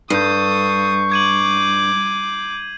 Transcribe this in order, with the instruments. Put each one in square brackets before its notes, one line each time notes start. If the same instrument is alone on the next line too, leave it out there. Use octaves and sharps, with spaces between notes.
[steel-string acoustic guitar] G2 [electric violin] A4 D#6 [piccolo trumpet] C#6 [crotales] G6 C7
[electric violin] D6 [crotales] G#6 D#7 F#7